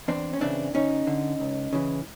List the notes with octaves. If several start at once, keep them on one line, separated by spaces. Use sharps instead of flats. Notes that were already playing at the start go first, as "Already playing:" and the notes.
E2 C4 D4
C#4
C#3 E3 C4 D4
D2 C#4 D#4
D3
C#2
C#3 E3